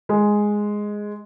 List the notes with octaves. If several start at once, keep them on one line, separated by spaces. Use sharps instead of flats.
G#3